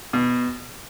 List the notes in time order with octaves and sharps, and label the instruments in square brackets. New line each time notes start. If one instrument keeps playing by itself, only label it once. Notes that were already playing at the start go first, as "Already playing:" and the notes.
[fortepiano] B2